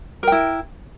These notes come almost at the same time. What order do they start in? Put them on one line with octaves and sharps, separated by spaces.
A#4 G5 E4